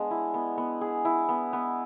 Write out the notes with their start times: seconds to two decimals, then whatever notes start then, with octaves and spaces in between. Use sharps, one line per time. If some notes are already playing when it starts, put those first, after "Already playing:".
Already playing: G#3 B3 D4 G#4
0.11 E4
0.34 B3
0.58 B3
0.81 G#4
1.05 E4
1.29 B3
1.53 B3